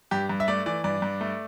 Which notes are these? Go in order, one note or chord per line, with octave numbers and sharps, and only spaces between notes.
G2 G4
G2
E5
A3 D5
E3 D5
G2 D5
G2
A3